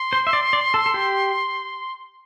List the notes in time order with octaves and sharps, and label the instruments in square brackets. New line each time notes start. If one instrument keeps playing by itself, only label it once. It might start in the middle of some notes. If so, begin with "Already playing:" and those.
Already playing: [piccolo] C6
[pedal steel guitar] C5
E5
D5
D5
A4
A4
G4